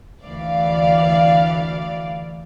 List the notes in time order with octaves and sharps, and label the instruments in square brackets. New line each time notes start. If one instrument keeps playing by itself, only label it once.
[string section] D2 E3 D5 F5